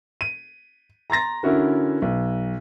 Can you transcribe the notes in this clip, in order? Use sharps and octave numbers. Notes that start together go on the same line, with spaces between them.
D#7
A#5 C6 A6 A#6
D3 C#4 E4 F#4 A#4
B1